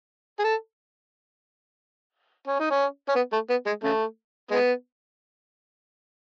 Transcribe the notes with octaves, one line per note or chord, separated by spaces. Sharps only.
G#4
A4
C#4
D#4
C#4
C#4
B3
A3
B3
G#3
C#3 A3
G#3 B3